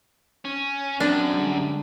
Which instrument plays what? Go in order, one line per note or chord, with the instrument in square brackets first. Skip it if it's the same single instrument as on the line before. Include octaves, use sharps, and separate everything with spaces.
[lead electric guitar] C#4
[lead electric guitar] F#2 [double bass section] C4 [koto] D4
[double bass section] D3 G3 G#3